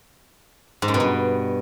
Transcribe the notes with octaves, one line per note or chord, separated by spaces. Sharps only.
G#2
F#2
B2
G2